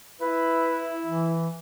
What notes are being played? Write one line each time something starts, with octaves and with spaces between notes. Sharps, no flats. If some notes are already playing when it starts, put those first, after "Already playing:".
E4 B4
E3